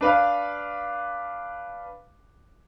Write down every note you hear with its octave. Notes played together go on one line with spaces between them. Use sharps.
D4 B4 F5